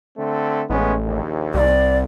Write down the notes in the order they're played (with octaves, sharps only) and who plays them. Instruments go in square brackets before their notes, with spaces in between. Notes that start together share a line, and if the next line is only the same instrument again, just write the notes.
[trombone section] D3 A3 C4
[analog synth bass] A1 [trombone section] G#3 B3 C#4
[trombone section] A#1 D#2
[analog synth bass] C2 [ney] D5